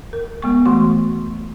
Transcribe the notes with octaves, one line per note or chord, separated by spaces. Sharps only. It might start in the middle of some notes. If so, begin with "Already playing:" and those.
A#4
G#3 B3 C#6
E3 A3 F#4 C6 C#6